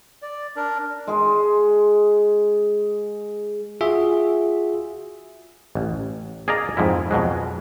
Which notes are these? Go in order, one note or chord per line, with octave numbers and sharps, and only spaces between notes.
D5
D4 A#4
G#3 G#4
F4 F#4 G#4 E5
A1
G#4 A#4 D5 D#5 F5 A#5
F2 G#2 F3 E4
F2 B2 F#3 G#3